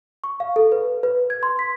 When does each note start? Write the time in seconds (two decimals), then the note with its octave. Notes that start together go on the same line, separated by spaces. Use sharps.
0.24 C#6
0.40 F5
0.56 A4
0.72 B4
1.03 B4
1.30 G#6
1.43 C6
1.59 B6